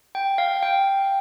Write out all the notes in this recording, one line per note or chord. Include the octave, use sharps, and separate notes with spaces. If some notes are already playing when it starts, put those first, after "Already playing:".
G5
F5
G5